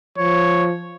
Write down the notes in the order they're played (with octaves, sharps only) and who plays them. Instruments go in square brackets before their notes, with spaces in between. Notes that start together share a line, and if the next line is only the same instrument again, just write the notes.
[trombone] F3 [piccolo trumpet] C#5